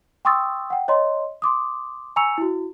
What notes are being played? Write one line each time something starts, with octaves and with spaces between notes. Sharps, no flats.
G5 C6 C#6 D#6 E6 A6
F#5 G5
C#5 D#5 A#5 C6
C6 D6 D#6
G#5 A#5 C#6 E6 C#7 F7
E4 F#4